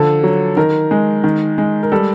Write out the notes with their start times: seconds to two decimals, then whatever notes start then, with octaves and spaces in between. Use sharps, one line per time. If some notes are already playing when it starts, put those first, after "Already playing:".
Already playing: D3 F3 A4
0.24 F#3
0.57 D#3 A#4
0.91 G#3
1.24 D#3
1.58 G#3
1.83 A#4
1.92 G3 A4